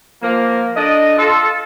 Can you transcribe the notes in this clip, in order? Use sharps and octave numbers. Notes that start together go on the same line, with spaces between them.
F3 A#3
D4 A4 D#5
F4 A4